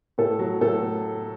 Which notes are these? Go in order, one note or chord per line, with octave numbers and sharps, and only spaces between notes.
A2 A4
F#3
A2 A4